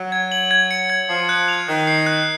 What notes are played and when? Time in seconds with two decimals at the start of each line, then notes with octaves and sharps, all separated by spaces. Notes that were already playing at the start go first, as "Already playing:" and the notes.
Already playing: F#3
0.12 G#6
0.32 F#7
0.51 G#6
0.71 C#7
0.90 G#6
1.09 F3 C7
1.29 F#6
1.48 F7
1.68 D#3 F#6
1.87 C7
2.07 F#6